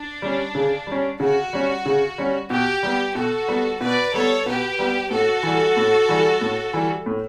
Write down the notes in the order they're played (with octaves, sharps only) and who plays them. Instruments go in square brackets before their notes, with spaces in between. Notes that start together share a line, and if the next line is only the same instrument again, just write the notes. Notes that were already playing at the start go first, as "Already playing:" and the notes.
Already playing: [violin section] D4
[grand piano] G3 C#4
C#3
G3 C#4
[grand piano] C#3 [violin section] F#4
[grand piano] G3 C#4
C#3
G3 C#4
[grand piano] B2 [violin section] G4
[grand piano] G3 B3
[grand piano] B2 [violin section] F#4 A4
[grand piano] G3 B3
[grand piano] B2 [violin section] B4 D5
[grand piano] G3 B3 [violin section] A4 C#5
[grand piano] B2 [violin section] G4 B4
[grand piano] G3 B3
[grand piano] A2 [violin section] F#4 A4
[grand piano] E3 G3
A2
E3 G3
A2
E3 G3
A2